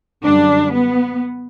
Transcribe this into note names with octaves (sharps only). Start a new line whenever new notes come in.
F#2 D3 G3 D4
B3